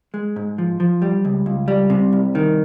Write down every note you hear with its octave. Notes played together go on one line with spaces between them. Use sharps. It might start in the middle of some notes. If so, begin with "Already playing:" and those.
G#3
G#2
F3
F3
G3
C#2
C#2
G3
C3
C2
D#3